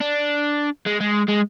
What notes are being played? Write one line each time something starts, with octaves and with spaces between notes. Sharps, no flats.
D4
G#3
G#3
G#3